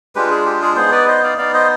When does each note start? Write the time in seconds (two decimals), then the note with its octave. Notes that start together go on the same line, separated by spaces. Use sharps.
0.15 G#3 D4 F4 G4 B4
0.31 G#4
0.46 G4
0.62 G#4
0.76 B3 D#4 G#4 C5
0.92 B4 D5
1.08 C5 D#5
1.23 D5 F5
1.38 B3 D#4 D5 F5
1.54 C5 D#5